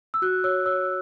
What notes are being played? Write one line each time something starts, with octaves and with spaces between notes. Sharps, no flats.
E6
F#4 F#6
C#5 E6
C#5 E6